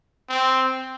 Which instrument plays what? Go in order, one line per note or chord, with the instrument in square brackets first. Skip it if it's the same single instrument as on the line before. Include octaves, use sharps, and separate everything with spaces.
[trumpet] C4